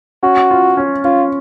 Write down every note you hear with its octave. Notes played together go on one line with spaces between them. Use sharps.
C#4 F#4
F4
C#4
C#4 F4